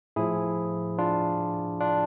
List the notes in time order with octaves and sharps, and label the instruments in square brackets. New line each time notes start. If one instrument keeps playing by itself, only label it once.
[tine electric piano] A2 F3 E4 G#4
D4 F4
D4 F4